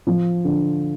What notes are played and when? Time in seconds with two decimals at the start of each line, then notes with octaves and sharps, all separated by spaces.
0.07 F3
0.44 D3